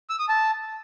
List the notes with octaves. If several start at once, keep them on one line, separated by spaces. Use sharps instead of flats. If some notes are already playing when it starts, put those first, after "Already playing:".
E6
D#6
A5